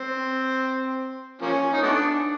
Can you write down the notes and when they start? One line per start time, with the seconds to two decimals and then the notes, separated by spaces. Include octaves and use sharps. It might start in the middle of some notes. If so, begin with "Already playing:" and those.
Already playing: C4
1.41 F3 A#3 C#4
1.72 D#4
1.83 A3 B3 D4